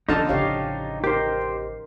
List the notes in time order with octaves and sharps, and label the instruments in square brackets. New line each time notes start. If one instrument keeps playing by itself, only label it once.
[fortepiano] D3 F4 A5 [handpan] F3 C#4 [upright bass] B3 [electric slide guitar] D#4
[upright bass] A1 C#3 [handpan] G4 C#5 F5
[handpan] D#4 A#4 [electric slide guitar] G4 C5